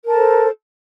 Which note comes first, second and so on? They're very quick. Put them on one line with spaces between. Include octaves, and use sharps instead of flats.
A#4 A5 A4 C5